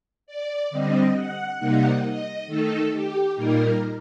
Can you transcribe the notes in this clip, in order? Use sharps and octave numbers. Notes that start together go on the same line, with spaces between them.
D5
D3 G3 C4 D#5
F#5
C3 G3 A#3 D#4
D#5
D#3 A3 D#4 A4
G4
A#2 G3 A#3 D#4 A#4